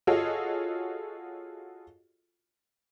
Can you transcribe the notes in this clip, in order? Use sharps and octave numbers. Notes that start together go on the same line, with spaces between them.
F4 F#4 G#4 A4 C#5 D#5